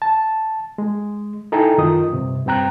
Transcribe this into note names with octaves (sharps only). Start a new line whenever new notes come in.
A5
G#3
D#4 E4 A4 G5 G#5 A#5
F#2 D#3 D#4 F4 D#6
G2 C3
G2 C4 G5 A#5 F#6